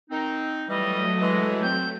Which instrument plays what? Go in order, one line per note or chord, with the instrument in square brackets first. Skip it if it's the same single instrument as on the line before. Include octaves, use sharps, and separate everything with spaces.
[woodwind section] D#3 C4 D#4
[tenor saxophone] E3 [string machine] F#3 A3 [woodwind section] G3 [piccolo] D#5
[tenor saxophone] E3 [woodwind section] G#3
[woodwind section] C4 [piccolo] G6